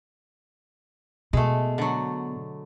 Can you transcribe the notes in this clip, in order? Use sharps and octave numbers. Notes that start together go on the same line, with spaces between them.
B2 G#3 A3
D3 F#3